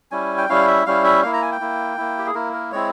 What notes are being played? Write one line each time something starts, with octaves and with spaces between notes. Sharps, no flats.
G3 C#4 E4 G#5
G5
G3 C#4 E4 F5
E5
G3 C#4 E4 F5
E5
A#3 E4 F5
A#5
G#5
G5
A#3 E4
A#3 E4
G4
G#4
A#3 E4 A#4
A#4
G#3 C4 E4 C#5